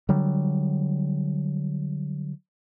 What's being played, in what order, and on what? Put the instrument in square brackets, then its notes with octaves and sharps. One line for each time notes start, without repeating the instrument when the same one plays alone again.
[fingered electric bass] D3 F#3 G3